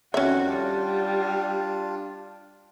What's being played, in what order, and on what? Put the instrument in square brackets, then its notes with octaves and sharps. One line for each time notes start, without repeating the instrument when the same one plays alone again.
[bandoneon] F2 D#3 [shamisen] C#4 E5 [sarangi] F#4
[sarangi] G3 [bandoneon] D4 F4